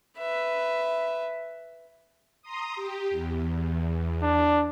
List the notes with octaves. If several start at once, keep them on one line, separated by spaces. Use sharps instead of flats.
B4 E5
A#5 C6 D#6
G4
E2
D4